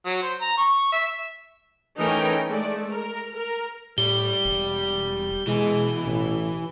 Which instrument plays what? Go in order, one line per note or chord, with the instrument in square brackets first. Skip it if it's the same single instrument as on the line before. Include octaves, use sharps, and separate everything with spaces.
[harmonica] F#3
C5
A#5
C#6
E5
[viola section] E3 A3 C#4 D#4 A#4 G5
G#3 A3 D5
A#4
A#4
[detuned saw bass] A2 [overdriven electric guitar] G3 [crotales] G7
[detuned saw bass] E1
[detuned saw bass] B2 [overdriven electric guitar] E3 [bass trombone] G#3
[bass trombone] A1